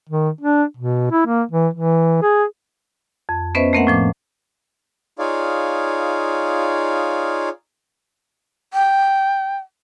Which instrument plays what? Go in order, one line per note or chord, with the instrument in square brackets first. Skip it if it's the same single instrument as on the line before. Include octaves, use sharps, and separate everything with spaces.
[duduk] D#3
D4
B2
E4
A#3
E3
E3
G#4
[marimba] F2
B3 C#4 B4 C5 D#5 E5
A3 A#3 C4 A#4 E5 F#5
A2 F3 D6
[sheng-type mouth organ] D#4 F4 G#4 C#5 D5 F5
[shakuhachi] G5